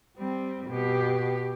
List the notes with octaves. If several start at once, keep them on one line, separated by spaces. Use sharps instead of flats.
G3 C4
B2 G4